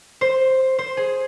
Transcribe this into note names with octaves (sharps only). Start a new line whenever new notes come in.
C5
C5
G#4